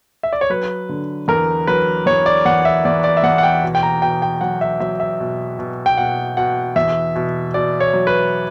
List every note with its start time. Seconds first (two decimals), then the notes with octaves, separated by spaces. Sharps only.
0.23 E5
0.33 D5
0.41 C#5
0.50 F#3 B4
0.89 D3
1.28 E2 A#4
1.67 F#3 B4
2.06 E2 C#5
2.26 D5
2.45 E2 F#5
2.65 E5
2.85 E2 D5
3.04 D5
3.17 E5
3.24 E2 F#5
3.38 F#5
3.43 G5
3.63 B2
3.75 G5
3.83 A#5
4.02 B2 G5
4.22 G5
4.41 F#3 F#5
4.61 E5
4.80 F#3 E5
5.00 E5
5.20 B2
5.59 B2
5.86 G5
5.98 B2 F#5
6.37 B2 F#5
6.76 E2 E5
7.15 B2
7.54 B2 D5
7.80 C#5
7.94 F#3
8.07 B4